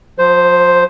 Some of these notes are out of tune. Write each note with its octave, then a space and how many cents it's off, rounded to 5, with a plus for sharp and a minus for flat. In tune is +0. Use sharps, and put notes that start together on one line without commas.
F3 +40 C5 +0